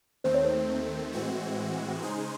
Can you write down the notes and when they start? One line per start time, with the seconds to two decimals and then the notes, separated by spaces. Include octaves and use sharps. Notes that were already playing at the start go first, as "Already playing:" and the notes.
0.24 D#2 D#3 A3 C4 C5
0.34 C#5
0.45 C5
1.12 A2 E3 G#3 C4 F#4
2.02 C#3 G#3 D#4 G#4 C5